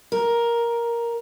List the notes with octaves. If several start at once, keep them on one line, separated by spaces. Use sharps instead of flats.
A#4